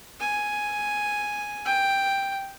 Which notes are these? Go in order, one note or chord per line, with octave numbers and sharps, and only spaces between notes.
G#5
G5